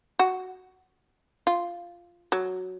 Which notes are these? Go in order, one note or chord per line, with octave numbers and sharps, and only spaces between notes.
F#4
F4
F#3